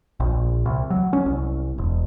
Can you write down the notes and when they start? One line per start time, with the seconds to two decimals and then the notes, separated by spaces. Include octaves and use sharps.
0.20 A#1
0.66 C2
0.90 F#3
1.13 C#4
1.26 C2
1.78 E1